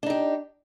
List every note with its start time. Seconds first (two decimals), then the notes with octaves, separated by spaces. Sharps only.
0.03 D4
0.06 D#4
0.10 G4